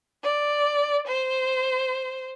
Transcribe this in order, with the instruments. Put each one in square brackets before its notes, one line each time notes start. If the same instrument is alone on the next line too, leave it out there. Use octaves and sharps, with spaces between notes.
[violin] D5
C5